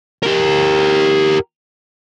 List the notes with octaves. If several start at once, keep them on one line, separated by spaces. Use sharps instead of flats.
G4 A#4